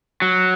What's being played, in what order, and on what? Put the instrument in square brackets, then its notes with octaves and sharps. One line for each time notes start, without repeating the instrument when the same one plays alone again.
[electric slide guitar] F#3